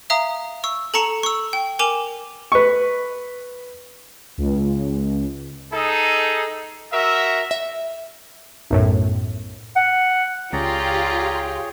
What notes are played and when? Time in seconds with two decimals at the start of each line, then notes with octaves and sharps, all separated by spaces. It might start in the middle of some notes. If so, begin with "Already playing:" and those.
0.10 E5 F5 A#5 D#6
0.64 C#6 E6
0.94 A4 A5 A#5 C#6 C#7 E7
1.23 C#6 E6
1.53 G5
1.79 A#4 G#5 D6 E7 F7
2.52 B4 C#6
4.38 C#2
5.72 D#4 G#4 A4
6.93 F#4 A#4 E5
7.51 E5
8.70 B1 F#2 A2
9.76 F#5
10.53 C#2 F4 G4 G#4 C#5 D5 G5 A#5